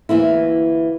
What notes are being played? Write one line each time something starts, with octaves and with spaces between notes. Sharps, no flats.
D2 E3 A#3 E4